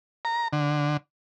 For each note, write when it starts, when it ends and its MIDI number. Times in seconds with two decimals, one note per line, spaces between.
0.25 0.48 82
0.53 0.97 50